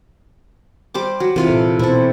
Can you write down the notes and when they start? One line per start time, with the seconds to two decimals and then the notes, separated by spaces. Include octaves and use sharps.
0.94 G3 C5 D6
1.20 F#3
1.36 C3 E3 E4 F4 A#4 F5
1.48 A#2 A4
1.79 B2 C4 E4 A4 C5